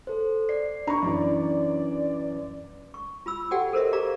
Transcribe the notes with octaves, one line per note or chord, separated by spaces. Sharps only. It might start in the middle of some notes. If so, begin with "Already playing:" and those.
A4 C5
D5 C7
D4 A#5 B5 C#6
F#2 E3 D5
C#6
F4 B5 E6
F#4 G4 A4 D5 F#5 G5
A4 A#4 C5 C#5 D#5 E5
G4 D5 F5 A#5 D6